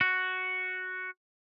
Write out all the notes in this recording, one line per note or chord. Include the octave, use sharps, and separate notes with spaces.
F#4